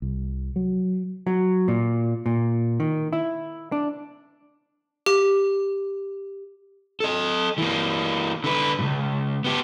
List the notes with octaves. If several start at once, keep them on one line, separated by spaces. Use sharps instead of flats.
C2
F#3
F#3
A#2
A#2
D#3
E4
D4
G4
A4 D#5
E3 A#3
D3 B4
C#2 G2
B3 G4